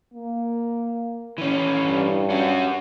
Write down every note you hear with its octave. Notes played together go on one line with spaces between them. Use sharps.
A#3
E3 C#4
G2
C#4 F#4